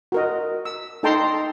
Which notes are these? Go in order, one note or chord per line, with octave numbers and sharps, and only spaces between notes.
F#4 A#4 D#5
E6
D#4 A4 G5 A5 A#5 C6